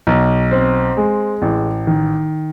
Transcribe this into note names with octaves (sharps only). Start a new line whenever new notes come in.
B1
C4
G#3
A1
D#3